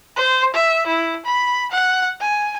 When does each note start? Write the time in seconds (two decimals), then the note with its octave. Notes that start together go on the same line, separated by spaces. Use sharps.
0.17 C5
0.54 E5
0.87 E4
1.25 B5
1.72 F#5
2.21 G#5